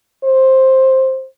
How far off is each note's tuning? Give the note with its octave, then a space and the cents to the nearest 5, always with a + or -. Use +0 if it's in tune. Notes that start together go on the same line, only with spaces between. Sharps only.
C5 +10